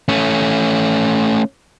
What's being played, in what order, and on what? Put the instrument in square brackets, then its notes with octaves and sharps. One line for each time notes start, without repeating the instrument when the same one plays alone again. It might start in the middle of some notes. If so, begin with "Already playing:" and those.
[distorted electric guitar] A3 C#4